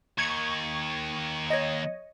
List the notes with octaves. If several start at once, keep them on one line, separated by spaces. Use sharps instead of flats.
D#2 D#3 C#6 G#6 C#7
C#5 D#5